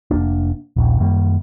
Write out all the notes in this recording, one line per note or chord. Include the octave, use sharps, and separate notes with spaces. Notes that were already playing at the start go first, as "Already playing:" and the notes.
F1 F#2 A#3 D4
D#1 A#1
F#2 D#3 G3 A#3